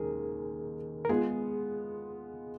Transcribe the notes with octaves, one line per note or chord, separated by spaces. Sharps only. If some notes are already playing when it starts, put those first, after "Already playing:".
Already playing: D#2 D#3 G#3 C#4 G#4 A#4
A#4
G#3 B3 F4 G#4